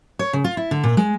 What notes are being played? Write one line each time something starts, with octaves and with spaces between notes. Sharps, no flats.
C#5
C#3
F4
E4
D3
A#2
G#3